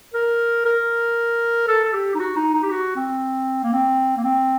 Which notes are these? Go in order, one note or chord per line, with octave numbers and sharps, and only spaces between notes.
A#4
A#4
A4
A4
G4
D#4
F#4
D#4
D#4
G4
F#4
C4
A#3
C4
A#3
C4